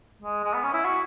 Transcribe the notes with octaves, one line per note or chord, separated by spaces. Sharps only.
G#3
G#3
B3
C#4
E4
F#4